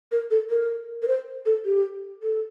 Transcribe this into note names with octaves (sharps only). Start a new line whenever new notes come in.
A#4
A4
A#4
A#4
C5
A4
G4
A4